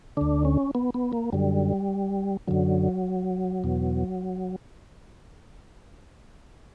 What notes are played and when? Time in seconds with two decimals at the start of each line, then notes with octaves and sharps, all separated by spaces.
0.17 D2 D3 D4
0.45 C#4
0.75 B3
0.94 B3
1.13 A#3
1.32 F#2 D3 G3
2.48 F#2 D3 F#3
3.64 E2 B2